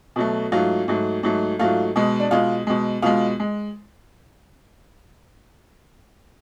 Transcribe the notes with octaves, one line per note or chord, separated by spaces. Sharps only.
B2 F#3 A3
G#2 F#3 A3 F4
G#2 F#3 A3
G#2 F#3 A3
G#2 F#3 A3 F4
B2 G#3
D4
B2 G#3 F4
B2 G#3
B2 G#3 F4
G#3